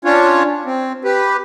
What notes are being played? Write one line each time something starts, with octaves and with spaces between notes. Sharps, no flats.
C#4 D4 F4 C#5
C4
G4 B4